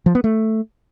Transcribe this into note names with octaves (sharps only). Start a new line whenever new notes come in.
F3
B3
A3